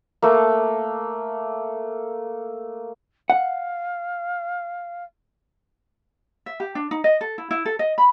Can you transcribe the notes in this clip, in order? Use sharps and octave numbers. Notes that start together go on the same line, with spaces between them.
A3 A#3
F5 F#5
E5
G4
D4
D#4
D#5
A4
E4
E4
A4
D#5
B5